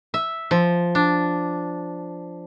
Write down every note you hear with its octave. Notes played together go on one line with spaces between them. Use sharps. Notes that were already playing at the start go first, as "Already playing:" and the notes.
E5
F3
D4